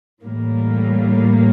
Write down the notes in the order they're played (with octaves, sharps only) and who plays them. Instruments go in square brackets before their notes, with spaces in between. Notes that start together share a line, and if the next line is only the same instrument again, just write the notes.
[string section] A2 E3 G3 A#3